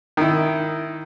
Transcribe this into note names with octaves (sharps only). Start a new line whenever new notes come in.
D#3 E4